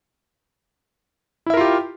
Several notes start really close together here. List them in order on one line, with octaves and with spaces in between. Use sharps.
E4 E5 A#4 F4 G4